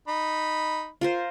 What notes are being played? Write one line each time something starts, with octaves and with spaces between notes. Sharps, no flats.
D#4 B5
F4 A#4 C5